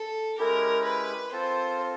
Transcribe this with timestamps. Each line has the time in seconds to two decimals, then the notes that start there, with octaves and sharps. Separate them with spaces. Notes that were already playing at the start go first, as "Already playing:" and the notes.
Already playing: A4
0.38 G#3 C#4 E4 G4 A#4
0.85 B4
1.31 C4 F4 A4 C5